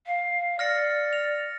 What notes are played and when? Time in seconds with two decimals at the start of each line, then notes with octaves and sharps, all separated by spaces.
0.07 F5
0.59 D5 F6 A#6 C#7
1.13 F7